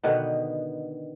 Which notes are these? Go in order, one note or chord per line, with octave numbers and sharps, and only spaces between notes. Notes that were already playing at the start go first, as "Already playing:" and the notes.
B2 D3 D#3 B3